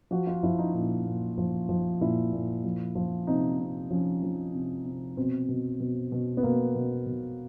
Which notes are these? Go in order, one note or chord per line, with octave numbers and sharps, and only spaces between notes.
F3 F#4
F4
F3 E4
D#4
A#2 D#4
A#2
F3
F3
A#2 E4
A#2
F3
F3
C3 D#4
C3
F3 C#4
F3
C3
C3
B2 C4
B2
B2
B2
B3
B2 A#3
B2
B2